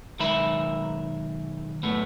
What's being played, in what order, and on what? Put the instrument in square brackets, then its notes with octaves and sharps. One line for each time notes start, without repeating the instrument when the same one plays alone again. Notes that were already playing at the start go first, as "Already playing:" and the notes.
[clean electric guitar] B1 D#3 G#3 A#4 E5 B5
F#2 A2 A3 B3